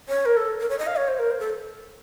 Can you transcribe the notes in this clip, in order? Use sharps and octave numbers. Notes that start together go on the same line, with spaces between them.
C#5
A#4
A4
A#4
C#5
D#5
F5
C#5
C5
A#4
C5
A4